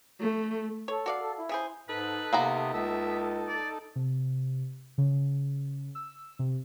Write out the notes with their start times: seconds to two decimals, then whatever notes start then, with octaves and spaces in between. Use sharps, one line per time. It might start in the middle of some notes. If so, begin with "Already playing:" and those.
0.21 A3
0.88 A4 C#5
1.06 F#4 D5 F5
1.21 A4
1.37 E4
1.49 C#3 G#4 C5
1.89 G#2 D#4 A4 B4
2.33 C3 A#3 B3 A#5
2.73 C#2 E5
3.48 D5
3.96 C3
4.98 C#3
5.95 E6
6.39 C3